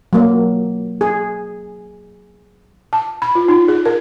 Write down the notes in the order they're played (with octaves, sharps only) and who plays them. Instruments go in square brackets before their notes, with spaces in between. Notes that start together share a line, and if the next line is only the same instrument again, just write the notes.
[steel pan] F#3 A#3
G#4
[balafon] A5
B5
F4
D#4
G#4
A#4